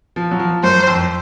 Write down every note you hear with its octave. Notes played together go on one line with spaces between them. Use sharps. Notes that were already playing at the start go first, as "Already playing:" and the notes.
F3
F#3
F3
F#2 C5
F2